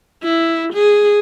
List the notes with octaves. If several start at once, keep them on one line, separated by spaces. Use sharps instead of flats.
E4
G#4